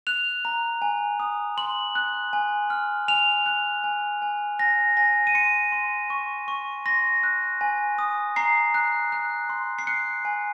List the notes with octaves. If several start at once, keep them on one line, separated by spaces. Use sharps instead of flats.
F#6 F7
A#5
G#5
D#6
C6 F#7
F#6
G#5
F6
G#5 F7
F#6
G#5
G#5
G#5 A#6
G#5 A#6
D#7
C6 C#7
C6
C#6
C#6
C6 A#6
F#6
G#5
D#6
A#5 C7
F#6
F#6
C6
C7
F#6 C#7
G#5